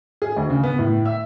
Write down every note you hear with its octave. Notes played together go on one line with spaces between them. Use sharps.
G#4
D2
C#3
B3
A2
E5